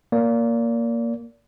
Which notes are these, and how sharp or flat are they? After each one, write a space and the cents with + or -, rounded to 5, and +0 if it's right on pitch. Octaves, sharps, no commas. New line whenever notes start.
A#3 +0 D5 -30